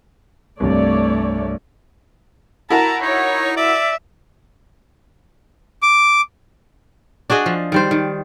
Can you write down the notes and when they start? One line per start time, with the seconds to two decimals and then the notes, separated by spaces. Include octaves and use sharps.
0.60 C2 G2 A3 C#5 D5
2.70 E4 F#4 A#4 A5 A#5
3.02 D#4 C#5
3.57 D5 E5
5.82 D6
7.30 D4 F#4 G#4 D#5
7.46 F3
7.72 D#3 G3 C5
7.91 D#3